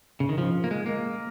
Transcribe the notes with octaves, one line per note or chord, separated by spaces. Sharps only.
C#3
D#3
F3
A#3
G#3
A#3